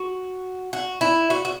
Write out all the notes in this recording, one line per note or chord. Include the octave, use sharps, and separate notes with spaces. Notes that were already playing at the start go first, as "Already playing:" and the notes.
Already playing: F#4
F#4
E4
F#4
F#4